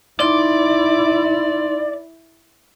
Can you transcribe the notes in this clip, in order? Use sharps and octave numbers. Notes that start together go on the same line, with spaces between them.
D#4 E4 D5 C6